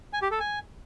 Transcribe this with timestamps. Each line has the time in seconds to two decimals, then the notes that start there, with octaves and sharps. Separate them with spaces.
0.13 G#5
0.22 G4
0.31 A4
0.40 G#5